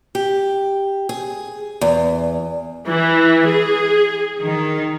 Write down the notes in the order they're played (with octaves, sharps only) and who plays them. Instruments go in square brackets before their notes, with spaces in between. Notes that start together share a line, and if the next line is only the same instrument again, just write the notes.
[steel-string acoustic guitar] G4
G#4
E2
[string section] E3
G#4
D#3